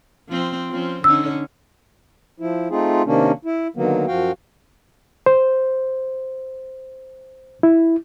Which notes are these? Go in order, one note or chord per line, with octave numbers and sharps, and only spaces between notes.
F3 C4
F3 C4 C#4
D3 C#4 D#4 E6
F3 E4
A3 C4 D#4 F4 G#4
C3 D#3 A#3 C#4 D4
E4
D3 D#3 F#3 A#3 B3
F#2 F3 F#4 F5 G5
C5
E4